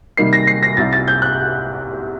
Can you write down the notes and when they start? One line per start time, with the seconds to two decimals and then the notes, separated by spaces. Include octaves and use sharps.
0.17 C3 D#3 G3 A#3 D#4 C7
0.33 A#6
0.47 C7
0.63 A#6
0.77 C2 C3 G3 A6
0.93 A6
1.08 G6
1.22 F#6